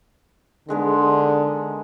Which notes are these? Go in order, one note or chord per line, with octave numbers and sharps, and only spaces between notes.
D3 D#3 G#3 B3